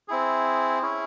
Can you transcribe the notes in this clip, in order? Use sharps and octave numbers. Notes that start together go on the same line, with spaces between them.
C4 E4 G#4
C#4 E4 G#4